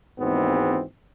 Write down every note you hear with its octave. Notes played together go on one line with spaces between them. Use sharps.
G#1 D#2 G#2 E3 B3 C4